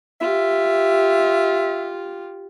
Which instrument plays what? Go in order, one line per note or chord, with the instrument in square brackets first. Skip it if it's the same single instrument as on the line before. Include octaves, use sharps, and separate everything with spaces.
[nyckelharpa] F4 G4 [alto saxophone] E5